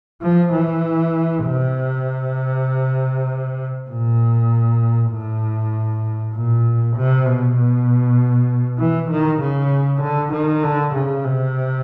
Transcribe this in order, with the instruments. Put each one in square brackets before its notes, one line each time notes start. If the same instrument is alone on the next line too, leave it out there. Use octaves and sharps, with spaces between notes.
[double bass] F3
E3
C3
A#2
A2
A#2
C3
B2
B2
E3
D#3
C#3
D3
D#3
D3
C#3
C3